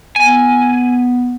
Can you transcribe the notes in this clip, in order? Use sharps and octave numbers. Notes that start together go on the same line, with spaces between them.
B3 G#5